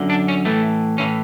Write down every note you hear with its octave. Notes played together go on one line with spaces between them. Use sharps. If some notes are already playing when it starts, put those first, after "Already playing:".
Already playing: F#2 D3
D4
C#4
A2 E3 A3
A2 E3 C#4